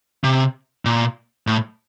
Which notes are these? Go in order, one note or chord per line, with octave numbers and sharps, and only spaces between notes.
C3
A#2
A2